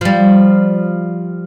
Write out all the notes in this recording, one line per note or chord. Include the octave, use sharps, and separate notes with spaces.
F3 G3